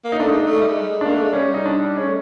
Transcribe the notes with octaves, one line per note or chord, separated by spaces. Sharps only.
A#3
D#4
A3 D4
G#3 D#4
A3
G3
G#3
A#3 D4
A3
G#3
G3 C#4
D#4
D4
G#3 C#4
A3